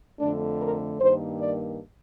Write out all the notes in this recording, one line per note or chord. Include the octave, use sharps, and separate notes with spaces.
F2 D3 A3 D4
A#4
G2 D#3 A#3 C5
D5